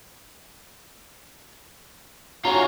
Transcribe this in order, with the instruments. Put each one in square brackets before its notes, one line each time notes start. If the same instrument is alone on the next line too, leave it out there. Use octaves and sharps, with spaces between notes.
[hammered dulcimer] C#4 [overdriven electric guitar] F4 F#4 [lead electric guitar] A#5